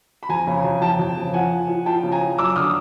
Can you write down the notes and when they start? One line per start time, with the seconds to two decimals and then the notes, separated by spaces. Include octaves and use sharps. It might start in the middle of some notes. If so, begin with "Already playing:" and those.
0.23 B5
0.29 F2 G#5 A#5
0.47 C#3
0.64 F2
0.81 F2 G5 A5
0.99 F2
1.17 C#3
1.33 F3 F#5 G#5
1.51 F3
1.68 F3
1.86 F3 G5 A5
2.03 C#3
2.12 G#5 A#5
2.20 F3
2.38 F#2 D6 E6
2.56 D3 D#6 F6